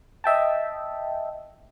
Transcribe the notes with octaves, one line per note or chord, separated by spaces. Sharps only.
D#5 E5 G5 A5